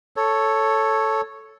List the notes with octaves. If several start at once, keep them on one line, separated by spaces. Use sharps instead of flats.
A4 C#5